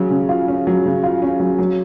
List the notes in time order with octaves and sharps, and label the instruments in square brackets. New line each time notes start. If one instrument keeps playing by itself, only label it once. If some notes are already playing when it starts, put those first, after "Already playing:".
Already playing: [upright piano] C#3 F#3 C#4
C#3
F4
C#4
F#3
C#3
F4
C#4
F#3
F#3